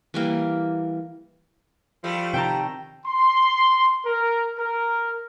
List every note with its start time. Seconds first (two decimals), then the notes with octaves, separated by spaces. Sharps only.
0.14 E3 G3 A#3
2.04 F3 G3 A3
2.34 C3 D#3 G5 A5 A#5
3.05 C6
4.05 A#4
4.58 A#4